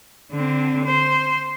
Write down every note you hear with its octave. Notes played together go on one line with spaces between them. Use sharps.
D3 C4
C5